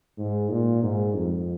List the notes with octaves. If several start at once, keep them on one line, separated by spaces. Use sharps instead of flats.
G#2
A#2
G#2
F2